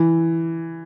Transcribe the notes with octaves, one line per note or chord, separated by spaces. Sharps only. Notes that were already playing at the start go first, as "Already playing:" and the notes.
Already playing: E3